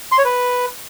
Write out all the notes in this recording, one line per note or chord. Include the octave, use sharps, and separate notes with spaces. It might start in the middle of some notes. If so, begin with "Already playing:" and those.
C6
C#5
B4